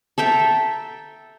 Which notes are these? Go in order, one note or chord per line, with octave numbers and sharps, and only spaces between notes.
A4 E5 G5 A#5